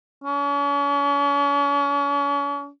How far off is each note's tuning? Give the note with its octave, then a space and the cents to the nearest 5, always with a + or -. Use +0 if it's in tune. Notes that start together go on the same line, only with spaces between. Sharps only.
C#4 +40